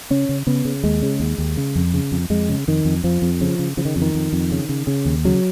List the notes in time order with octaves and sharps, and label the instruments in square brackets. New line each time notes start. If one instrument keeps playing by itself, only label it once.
[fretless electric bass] C#3 C#4
C#3
C#3 B3
C#3
D#2 G#3
C#3
D#2
D#2
C#3
F2
C#3
F2
F2 G#3
C#3
F2 D#3
F2
F2 F3
F2
C#3 F3
C#3
C#3 F3
D#3
F2
D#3
F2
F2
C#3
C#3
C#3
D#2
C#3 F#3